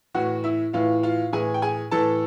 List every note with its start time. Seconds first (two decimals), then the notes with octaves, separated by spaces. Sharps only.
0.14 A2 E3 F#4 F#5
0.44 E4 E5
0.73 A2 E3 F4 F5
1.03 F4 F5
1.33 A2 E3 G#4 G#5
1.54 G5
1.62 G#4 G#5
1.91 A2 E3 A4 A5